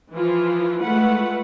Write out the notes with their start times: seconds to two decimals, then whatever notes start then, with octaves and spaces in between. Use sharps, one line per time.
0.13 E3 F3 E4 F4
0.81 G#3 A3 F4 B4 F#5